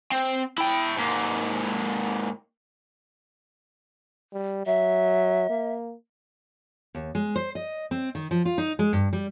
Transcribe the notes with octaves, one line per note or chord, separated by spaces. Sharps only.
C4
E4 G5
G#2 A#3
G3
F#3 E5
A#3
D#2
G#3
C5
D#5
C4
D#3
F3
F4
D#4
G#3
G2
G3